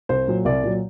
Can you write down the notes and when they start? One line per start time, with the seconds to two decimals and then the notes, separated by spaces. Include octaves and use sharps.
0.09 C2 C5
0.28 A#2 F#3
0.45 C2 D5
0.63 A#2 F#3